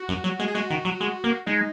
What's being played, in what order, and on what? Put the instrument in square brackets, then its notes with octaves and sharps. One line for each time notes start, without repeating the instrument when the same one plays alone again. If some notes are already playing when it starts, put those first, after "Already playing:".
Already playing: [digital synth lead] F#4
[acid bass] F#2
F#3
G#3
[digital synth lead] G#4
[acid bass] G#3 [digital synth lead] F#4
[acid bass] D#3
F#3
G#3
A#3
[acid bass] G#3 [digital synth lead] D#4